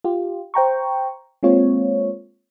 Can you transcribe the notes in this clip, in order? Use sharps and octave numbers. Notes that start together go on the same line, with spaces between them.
F4 G4
C5 G5 A#5 C#6
G#3 A#3 C4 F4 C#5